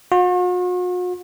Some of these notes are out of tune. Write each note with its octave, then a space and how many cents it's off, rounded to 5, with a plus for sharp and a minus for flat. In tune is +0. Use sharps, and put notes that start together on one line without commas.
F#4 -45